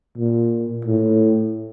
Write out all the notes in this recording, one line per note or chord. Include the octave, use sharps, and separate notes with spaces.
A#2
A2